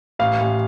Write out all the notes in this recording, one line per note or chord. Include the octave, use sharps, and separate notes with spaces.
A1 F5
A1